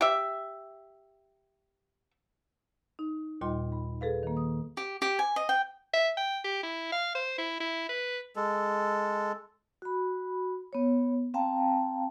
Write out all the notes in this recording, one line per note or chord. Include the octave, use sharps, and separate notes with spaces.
G4 E5
D#4
D#2 A#2 G3 F4 D#5 C6
B5
G#4 A4 B4 F5
D#3 A#3
D#6
G4
G4
G#5
D#5
G5
E5
G5
G4
E4
F5
C5
E4
E4
B4
G#3 A4
F#4 B5
B3 C#5
C4 F5 G5 A5 A#5